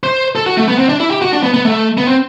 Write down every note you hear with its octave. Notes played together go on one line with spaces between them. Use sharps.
C5
A4
F#4
A3
B3
C4
D4
E4
G4
F#4
D4
B3
B3
A3
B3
C4